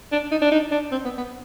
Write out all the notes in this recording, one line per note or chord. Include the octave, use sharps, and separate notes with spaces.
D4
D#4
D4
D#4
D4
C4
B3
B3